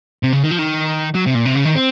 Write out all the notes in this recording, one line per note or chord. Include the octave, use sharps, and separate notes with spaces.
C3
C#3
D#3
F3
D#3
F#3
C3
A#2
C3
C#3
D#3
C4